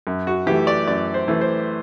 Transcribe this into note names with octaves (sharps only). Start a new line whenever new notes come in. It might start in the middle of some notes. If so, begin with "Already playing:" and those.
F#2
F#4
E3 A3 G4
D5
F#2 D5
C5
E3 A3
C5